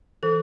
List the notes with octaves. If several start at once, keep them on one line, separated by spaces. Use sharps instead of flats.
E3 A4